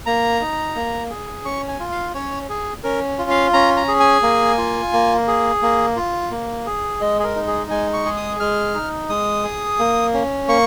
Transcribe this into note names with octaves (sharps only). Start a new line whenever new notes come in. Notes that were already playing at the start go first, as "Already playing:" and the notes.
A#3 A#5
D#4
A#3
G#4
C#4 C#6
G#5
F4
F5
C#4 C#5
G#4
C#4 A#4
F4
F5
C#4 A#5
A#5
G#4
G#5
A#3
F4
A#3
G#4
A#3
F4
A#3
G#4
G#3 D#5
G#4
A#4
D#4
G#4
G#3 G#5
C#6
G#4
D#6
G#3 F6
D#4
G#3 D#6
G#4
A#3
C#4
A#3 C#6